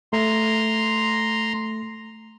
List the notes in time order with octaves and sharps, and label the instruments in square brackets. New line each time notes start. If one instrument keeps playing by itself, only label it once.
[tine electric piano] A3 [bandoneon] A#5 C6